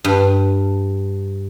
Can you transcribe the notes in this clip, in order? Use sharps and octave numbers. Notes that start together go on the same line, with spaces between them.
G2